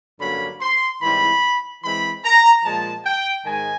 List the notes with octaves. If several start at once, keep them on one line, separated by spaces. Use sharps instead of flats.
G2 D3 F#3 A#3 C#4 B5
C6
G#2 E3 G3 C4 E4 B5
E3 G#3 C4 B5
A#5
A#2 F3 G#3 A5
G5
G#2 D#3 G#3 G#5